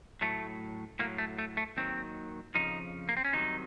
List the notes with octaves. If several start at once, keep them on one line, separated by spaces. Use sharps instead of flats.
A2 F#3 A3
A2 F#3 A#3
A3
A3
A3
D#2 D#3 F#3 C4
F2 C#3 F3 D#4
A#3
C4
C#4
C2 C3 D#3 F#3 D#4